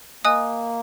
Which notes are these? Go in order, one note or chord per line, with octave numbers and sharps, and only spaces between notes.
A#3 D#5 G#5 D#6 F#6